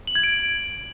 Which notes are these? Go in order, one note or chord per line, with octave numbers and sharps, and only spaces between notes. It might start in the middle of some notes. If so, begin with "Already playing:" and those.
F#7
G#6
D7